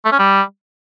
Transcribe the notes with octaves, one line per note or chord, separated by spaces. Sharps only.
A3
C#4
G3